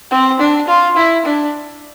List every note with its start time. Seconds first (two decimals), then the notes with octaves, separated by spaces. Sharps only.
0.11 C4
0.39 D4
0.68 F4
0.96 E4
1.25 D4